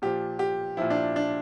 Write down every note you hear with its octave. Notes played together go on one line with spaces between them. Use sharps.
A#2 F3 G4
G4
A#2 F3 E4
D4
D4